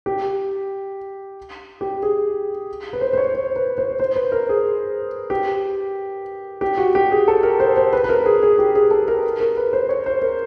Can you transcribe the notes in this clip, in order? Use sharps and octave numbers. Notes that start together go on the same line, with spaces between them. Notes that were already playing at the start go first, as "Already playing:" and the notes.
G4
G4
G#4
B4
C5
C5
C#5
C5
B4
C5
C5
B4
A#4
G#4
G4
G4
F#4
G4
G#4
A4
A#4
C5
C5
B4
B4
A#4
G#4
G#4
G4
G#4
A4
A#4
A#4
B4
C5
C#5
C5
A#4